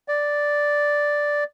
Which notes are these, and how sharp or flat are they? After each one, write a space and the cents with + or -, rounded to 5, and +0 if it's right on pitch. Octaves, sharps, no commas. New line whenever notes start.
D5 +0